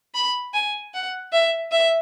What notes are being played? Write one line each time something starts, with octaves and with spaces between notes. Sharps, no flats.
B5
G#5
F#5
E5
E5